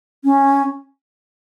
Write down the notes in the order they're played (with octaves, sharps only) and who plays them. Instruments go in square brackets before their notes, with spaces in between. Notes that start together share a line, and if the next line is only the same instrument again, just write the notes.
[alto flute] C#4